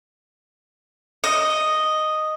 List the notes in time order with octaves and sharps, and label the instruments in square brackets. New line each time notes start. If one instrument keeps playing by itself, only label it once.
[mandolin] D#5